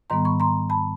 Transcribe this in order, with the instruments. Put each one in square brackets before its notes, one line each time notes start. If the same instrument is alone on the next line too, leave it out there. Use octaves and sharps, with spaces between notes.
[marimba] G#2 D#3 G3 B3 A#5 C6
B5 C#6
A#5 C6
A5 B5